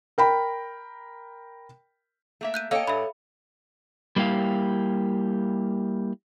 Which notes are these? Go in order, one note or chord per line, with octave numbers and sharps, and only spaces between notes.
A#4 G5 B5
A3 A#3 E5
F#6 G6 D#7
A#3 A4 C#5 D#5 F5 G5
G2 G3 E5 B5
G3 A#3 E4 G4 F5